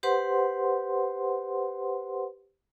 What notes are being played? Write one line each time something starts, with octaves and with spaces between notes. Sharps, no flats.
G4 B4 C5 F#5 C6